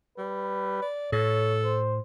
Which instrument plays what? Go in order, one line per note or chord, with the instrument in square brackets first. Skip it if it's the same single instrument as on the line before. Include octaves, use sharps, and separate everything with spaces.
[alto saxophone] G3 [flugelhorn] B4
[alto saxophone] D5
[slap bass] A2 [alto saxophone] A4 [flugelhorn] C#5
[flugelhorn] C5